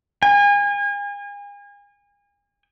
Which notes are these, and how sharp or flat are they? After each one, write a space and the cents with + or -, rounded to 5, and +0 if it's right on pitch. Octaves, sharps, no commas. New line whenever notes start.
G#5 -35